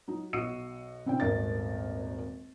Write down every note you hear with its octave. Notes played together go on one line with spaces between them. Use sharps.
F#3 D#4
B1 F#4 E6 C7 C#7 D#7
C#3 C4 D4 G5
D#1 G#1 A#4 D5 A6